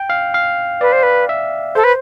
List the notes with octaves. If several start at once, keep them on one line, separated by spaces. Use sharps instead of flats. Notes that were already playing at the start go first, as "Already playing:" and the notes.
Already playing: G5
F5
F5
B4 D5
C5
B4
E5
A4 C5
B4